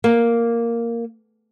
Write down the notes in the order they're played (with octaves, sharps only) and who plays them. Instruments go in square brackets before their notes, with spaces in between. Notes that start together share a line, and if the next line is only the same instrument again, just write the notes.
[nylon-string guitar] A#3